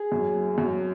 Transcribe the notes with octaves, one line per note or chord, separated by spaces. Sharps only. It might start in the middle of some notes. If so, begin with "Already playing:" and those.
Already playing: G#4
F#2
F#1
F#2